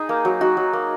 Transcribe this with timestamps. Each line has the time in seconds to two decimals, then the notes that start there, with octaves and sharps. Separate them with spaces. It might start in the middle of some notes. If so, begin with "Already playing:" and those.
Already playing: D#4 G#4
0.09 A#3
0.25 F#3
0.41 D#4 F#4
0.57 F#3
0.73 A#3